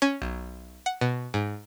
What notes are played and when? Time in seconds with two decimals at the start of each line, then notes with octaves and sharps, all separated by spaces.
0.02 C#4
0.22 B1
0.86 F#5
1.01 B2
1.34 G#2